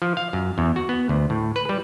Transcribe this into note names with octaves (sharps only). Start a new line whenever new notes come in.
F3
F5
F#2
E2
F#4
B3
D2
A2
B4
G3